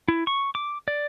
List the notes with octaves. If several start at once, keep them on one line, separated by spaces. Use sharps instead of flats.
E4
C#6
D6
D5